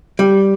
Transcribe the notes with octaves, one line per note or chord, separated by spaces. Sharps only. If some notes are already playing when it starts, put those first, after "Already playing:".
G3